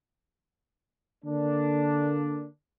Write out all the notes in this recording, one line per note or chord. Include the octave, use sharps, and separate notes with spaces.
D3 A#3 D4